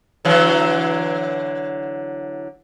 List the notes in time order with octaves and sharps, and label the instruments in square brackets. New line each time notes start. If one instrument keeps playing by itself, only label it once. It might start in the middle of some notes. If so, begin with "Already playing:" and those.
[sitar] D3 E3 F#3